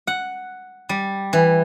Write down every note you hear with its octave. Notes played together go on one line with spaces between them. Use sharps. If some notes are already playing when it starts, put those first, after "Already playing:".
F#5
G3
E3